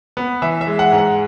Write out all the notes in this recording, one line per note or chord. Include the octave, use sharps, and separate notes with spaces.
B3
E3 E5
E5
G#3
F#5
G#2
F#5